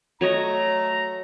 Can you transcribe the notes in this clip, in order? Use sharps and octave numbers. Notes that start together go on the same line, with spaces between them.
F#3 A3 C#5 D#5 A#5